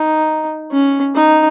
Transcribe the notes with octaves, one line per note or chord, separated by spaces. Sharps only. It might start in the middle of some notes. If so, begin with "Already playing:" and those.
Already playing: D#4
C#4
D#4